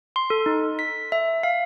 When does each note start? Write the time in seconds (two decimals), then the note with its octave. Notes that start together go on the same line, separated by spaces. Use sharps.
0.16 C6
0.30 A4
0.46 D#4
0.79 B6
1.12 E5
1.43 F5